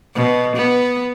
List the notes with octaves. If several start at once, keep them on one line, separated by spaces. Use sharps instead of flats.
B2
B3